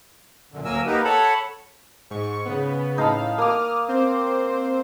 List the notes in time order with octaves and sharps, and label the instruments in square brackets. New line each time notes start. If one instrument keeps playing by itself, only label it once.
[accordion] F#2 A#2 D3
D2 F#3 A#3 A#4 G#5 E6
A#3 B3 D#4 G4 A#4 B4
A4 C#5 F#5 A5 B5
[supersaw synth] G#2 C#6
C#3 B3
[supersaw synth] A2 F5 [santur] D#4 A5 B5
[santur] A#3 D6 [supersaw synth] D#6 F6
[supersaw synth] C4 C5